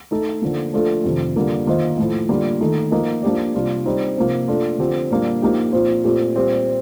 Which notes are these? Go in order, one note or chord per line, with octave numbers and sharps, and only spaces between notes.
A3 D#4 A4
D3 F3 A#3
F3 A3 D4 F4 A4
F2 C3 D#3
D3 G3 A#3 F4 A#4
D#3 A#3 F4 C5 D#5
A2 F3 A3
D3 G3 A#3 F4 A#4
D#3 A3 D#4 A4
F3 A#3 D#4 A#4 D#5
F3 A#3 D4 G4 D5
C3 G3 D4 F4
G3 C4 D#4
C3 F3 A#3
A3 D4 F4 A4
D3 F3 C4 G4
A#2 G3 A#3 D4
F3 A#3 D#4 G4
A#2 F3 C4 F4 C5
A#2 A3 C4 G4
A#2 G3 C4 G4